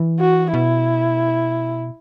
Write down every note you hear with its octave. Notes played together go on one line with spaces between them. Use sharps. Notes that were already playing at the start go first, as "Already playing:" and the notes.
Already playing: E3
F#4
B2 E4